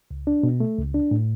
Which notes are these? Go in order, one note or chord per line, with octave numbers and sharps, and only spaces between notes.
C#2
D4
B2
A3
C#2
D4
A2